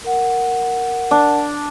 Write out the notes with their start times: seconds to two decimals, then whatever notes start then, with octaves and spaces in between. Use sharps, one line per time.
0.04 A#4 F#5
1.11 D4